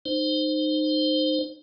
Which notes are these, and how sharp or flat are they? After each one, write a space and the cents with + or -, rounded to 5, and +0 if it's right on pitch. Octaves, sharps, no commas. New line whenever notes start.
D#4 -25 C5 +0